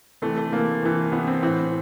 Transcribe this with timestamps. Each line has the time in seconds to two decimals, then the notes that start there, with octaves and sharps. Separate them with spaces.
0.22 C3 E3 A3
0.38 A3
0.52 C3 E3 A#3
0.83 C3 E3
1.12 C3 E3 B3
1.27 C4
1.42 A2 E3 C4